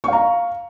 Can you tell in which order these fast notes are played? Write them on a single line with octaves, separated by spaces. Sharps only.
C#6 F5 A#5